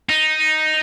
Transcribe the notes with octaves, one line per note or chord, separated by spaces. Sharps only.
D#4